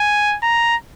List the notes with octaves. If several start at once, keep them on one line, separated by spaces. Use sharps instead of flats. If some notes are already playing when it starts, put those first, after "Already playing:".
Already playing: G#5
A#5